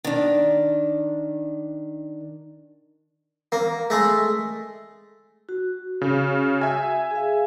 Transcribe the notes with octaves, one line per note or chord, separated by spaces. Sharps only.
D#3 D4
A#3
G#3 A3
F#4
C#3
E5 G#5
G#4 F5